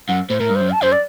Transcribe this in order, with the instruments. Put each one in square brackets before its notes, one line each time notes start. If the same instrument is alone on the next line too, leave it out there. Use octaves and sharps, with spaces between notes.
[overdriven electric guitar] F#2 [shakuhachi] F#5
[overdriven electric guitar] A2 [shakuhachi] C5
[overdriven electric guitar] A2 [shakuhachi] A#4
[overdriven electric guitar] G2
[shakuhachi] C5
[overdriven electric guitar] F#2
[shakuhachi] A5
[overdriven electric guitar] F#2 [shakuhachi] C5
[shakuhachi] D5